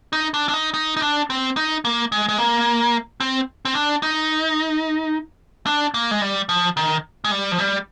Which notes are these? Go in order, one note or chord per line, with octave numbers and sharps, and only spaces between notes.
D#4
D4
D4
D#4
D#4
D#4
D4
C4
D#4
A#3
G#3
G#3
A#3
C4
C4
D4
D#4
D4
A#3
G#3
G3
F3
D#3
G#3
G3
F3
G3